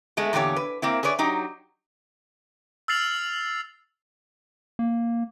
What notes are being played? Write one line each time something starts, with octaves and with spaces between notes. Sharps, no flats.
G#3 A3 B3
E2 A#2 D3 G4 C#5
B4
A#3 C4 E4
G#4 B4 C#5 D5
F#3 D#4 G4
E6 F6 A6 C7 F7 F#7
A#3